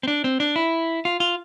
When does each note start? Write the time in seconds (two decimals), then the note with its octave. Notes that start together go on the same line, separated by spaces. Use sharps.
0.03 C4
0.08 D4
0.24 C4
0.40 D4
0.56 E4
1.05 F4
1.20 F4